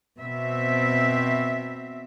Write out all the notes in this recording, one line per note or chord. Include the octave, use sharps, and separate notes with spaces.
B2 C4 E5